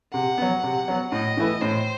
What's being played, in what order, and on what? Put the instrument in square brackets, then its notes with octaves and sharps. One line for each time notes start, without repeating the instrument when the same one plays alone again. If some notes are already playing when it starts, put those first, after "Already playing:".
[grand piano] C3 [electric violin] F#5
[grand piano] F#3 B3
C3
F#3 B3
[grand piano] A2 [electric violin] D#5
[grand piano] E3 A3 E4 B4
[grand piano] A2 [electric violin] C5